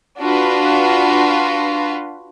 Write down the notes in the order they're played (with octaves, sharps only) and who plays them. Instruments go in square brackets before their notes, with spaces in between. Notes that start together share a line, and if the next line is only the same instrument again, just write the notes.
[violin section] D4 F4 F#4 B4